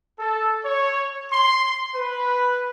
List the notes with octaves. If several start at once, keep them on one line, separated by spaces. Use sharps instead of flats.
A4
C#5
C6
B4